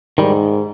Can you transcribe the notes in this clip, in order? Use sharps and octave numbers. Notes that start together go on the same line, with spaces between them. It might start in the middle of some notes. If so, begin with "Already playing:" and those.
G#2 D#3 G3